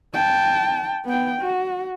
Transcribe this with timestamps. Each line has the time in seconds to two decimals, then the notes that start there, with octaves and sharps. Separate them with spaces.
0.14 G5 A5
1.05 B3 G5
1.41 F#4